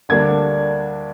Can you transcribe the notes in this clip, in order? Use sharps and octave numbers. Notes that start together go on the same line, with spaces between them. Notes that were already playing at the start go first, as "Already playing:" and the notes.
D2 D3 G3 A#3 D4 G#6